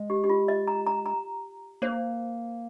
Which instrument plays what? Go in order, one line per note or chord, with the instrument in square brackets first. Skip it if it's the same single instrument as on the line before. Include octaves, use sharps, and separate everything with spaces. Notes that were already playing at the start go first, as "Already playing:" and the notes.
Already playing: [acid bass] G#3
[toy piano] G4
G4
F4
D#5
A#5
A#5
A#5
[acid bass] A#3 [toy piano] C5